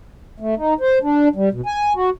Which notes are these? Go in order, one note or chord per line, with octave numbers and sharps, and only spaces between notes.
A3
D#4
C5
D4
G3
B2
G#5
F#4